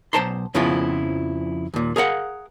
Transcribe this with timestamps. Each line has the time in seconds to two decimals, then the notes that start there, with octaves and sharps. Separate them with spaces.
0.13 B1 G#2 C5 A5 A#5 C6
0.54 F2 C#3 F3 B3 E4 F4
1.74 D#2 A#2
1.96 G#4 A#4 F5 F#5